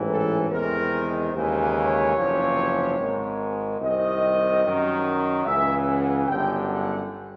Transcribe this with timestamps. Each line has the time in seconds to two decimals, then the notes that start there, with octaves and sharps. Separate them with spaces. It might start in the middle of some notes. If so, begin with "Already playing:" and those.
Already playing: A1 G#2 E3
0.09 A4
0.50 E2 C3 D#3 G#3 A#4
1.33 D#2 C#3 E3 G#3 C5
1.75 C#5
2.15 F#1 E2 C3 F3
2.98 G#1 G#2 D#3
3.80 C2 C3 D#3 D#5
4.62 F#2 D#3 F#3
5.45 C#2 C#3 E3 E5
5.87 F#5
6.27 G1 F#2 D3 G5
6.68 F#5